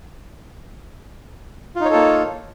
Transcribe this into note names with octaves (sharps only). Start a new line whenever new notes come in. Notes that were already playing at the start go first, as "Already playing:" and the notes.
A#3 D#4 F4 A4 C#5